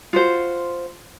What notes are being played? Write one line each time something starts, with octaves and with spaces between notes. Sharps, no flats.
F4 F#4 C5